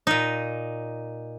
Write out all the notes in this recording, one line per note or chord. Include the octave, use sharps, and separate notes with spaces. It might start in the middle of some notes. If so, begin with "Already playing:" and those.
A#2 D#4